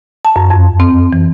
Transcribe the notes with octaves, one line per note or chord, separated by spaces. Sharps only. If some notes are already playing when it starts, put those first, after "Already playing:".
A5
F#2
F2
C4
E3